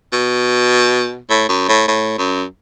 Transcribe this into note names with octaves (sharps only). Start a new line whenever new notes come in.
B2
A2
F#2
A2
A2
F#2